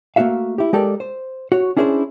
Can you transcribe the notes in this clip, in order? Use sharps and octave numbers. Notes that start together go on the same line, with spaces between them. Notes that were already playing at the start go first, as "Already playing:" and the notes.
A3 A#3 C#4 F#4 E5 F5
E4 G4
G#3 G4 A4 A#4 D5
C5
F#4 C#5
C#4 D4 E4 G#4 B4 C5